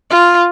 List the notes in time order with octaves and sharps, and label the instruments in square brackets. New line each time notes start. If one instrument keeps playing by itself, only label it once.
[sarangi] F4